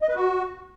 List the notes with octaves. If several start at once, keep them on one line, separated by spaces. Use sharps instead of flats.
D#5
B4
F#4